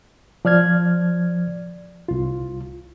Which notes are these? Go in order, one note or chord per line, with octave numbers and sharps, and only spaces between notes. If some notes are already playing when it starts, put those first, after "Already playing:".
F3 D5 F6 G#6
C2 F4